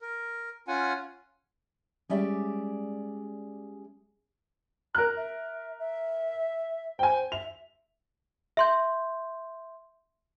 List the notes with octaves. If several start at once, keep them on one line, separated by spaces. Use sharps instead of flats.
A#4
C#4 F4 F#5 G#5
G3 G#3 C#4 G4 D5 E5
A#4 A#5 F#6
E5
E5
C5 G5 G#5
E5 F7
E5 C6 G6